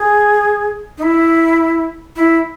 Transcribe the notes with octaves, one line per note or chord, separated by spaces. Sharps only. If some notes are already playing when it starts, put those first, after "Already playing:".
Already playing: G#4
D#4
E4
E4